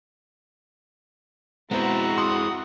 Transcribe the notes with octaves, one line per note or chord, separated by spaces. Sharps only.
G#3 B3 C4 E4 F#4 C5 A#5
C6 D#6